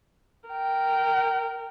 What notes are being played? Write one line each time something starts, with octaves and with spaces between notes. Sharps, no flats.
A#4 G5